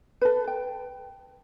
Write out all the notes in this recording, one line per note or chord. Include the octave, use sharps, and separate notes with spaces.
A4 B4
G5